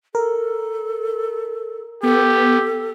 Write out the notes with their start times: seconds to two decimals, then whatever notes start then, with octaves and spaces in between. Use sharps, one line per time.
0.15 A4 A#4
2.03 B3 G4 A4